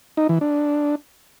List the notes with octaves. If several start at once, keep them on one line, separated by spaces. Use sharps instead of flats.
D#4
E3
D4